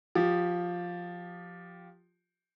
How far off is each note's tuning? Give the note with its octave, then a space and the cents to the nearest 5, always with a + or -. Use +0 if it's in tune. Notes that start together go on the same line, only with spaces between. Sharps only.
F3 +10 G4 -5